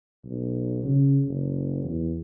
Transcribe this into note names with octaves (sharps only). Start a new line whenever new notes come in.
B1
C#3
F#1
E2